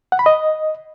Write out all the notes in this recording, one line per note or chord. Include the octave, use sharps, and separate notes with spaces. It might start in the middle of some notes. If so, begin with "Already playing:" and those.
F#5
B5
D#5